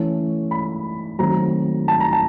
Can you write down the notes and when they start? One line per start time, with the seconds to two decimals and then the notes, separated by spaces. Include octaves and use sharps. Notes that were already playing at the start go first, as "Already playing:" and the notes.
Already playing: E3 A3 C#4
0.51 B5
1.19 D#3 F#3 A3 C4 A#5
1.88 A5
2.00 A#5
2.13 A5